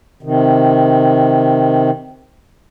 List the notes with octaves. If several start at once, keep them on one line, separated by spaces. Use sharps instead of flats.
C3 D#3